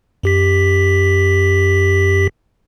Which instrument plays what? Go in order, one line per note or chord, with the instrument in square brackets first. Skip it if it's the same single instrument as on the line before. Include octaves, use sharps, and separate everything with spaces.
[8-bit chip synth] F#2 G4 B6